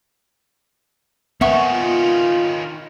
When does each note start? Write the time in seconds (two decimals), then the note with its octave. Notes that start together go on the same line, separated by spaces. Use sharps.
1.41 D#3 B3 C#4 E5 F#5 C#6
1.74 F4